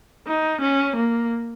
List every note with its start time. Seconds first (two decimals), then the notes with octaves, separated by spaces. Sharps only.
0.27 D#4
0.62 C#4
0.97 A#3